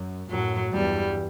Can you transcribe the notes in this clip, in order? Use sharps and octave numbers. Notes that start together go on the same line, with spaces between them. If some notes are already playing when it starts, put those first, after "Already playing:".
Already playing: F#2
F#2 A2 F#3
E2 G2 G3